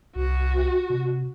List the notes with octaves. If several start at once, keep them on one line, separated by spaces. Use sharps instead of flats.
C2 F#4
C3